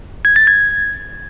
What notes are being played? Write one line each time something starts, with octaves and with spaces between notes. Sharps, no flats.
G#6
A6
G#6